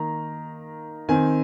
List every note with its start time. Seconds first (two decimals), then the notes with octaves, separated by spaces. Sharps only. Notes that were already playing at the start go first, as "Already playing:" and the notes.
Already playing: D#3 A#3 A#5
1.09 D#3 C4 G#5